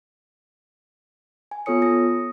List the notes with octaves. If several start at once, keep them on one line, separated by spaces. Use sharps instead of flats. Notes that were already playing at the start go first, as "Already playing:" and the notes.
G#5
B3 F4 A4 C#5 D#6 C#7
D#6 A#6